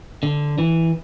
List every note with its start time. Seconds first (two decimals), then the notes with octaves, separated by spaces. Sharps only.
0.23 D3
0.58 E3